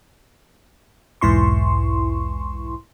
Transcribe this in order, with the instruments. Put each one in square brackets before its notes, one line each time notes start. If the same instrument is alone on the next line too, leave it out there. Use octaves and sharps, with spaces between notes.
[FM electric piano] B1 E2 G#2 E4 C6 C#6